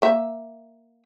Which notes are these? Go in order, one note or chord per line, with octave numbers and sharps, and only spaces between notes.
A#3 E5